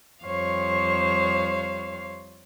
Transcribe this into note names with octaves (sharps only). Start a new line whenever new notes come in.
F2 G3 C5 C#5 F5 C#6